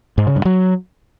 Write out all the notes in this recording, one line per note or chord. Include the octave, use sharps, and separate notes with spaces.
G#2
C#3
G2
F#3